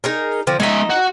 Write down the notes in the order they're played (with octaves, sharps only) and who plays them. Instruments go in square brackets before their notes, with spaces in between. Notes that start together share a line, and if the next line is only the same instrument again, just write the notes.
[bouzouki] D#4 G#4 A#4
D3 F3 C4
[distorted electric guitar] G#3 E5 [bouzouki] D#4 D#5
[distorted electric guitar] F#4